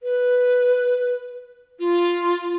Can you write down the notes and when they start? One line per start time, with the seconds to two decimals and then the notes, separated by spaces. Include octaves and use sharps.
0.03 B4
1.80 F4